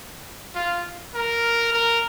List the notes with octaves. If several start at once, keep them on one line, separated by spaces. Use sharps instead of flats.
F4
A#4
A#4